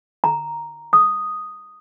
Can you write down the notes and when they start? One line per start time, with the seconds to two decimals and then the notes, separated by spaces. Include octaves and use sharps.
0.24 A#5
0.93 D#6